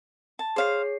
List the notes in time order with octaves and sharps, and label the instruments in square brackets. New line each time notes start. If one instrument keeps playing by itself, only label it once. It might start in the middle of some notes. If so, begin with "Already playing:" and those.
[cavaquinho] A5
[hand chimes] G#4 C#5 C7 [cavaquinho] C5 F5